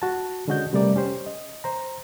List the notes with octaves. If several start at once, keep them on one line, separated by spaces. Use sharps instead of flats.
F#4 A5
D3 G#3 C#4 F#4 D#5 G6
C3 G3 A3 A#4 D5 D6
C#4 G4 C5
D#5
C5 A#5